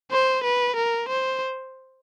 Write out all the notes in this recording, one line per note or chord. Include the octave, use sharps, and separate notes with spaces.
C5
B4
A#4
C5